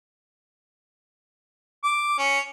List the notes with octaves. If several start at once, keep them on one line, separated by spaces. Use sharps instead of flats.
D6
C#4